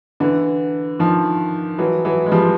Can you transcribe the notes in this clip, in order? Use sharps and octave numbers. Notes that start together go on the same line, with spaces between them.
D3 E3
D#3 F3
E3 F#3
E3 F#3
G#3
F3 G3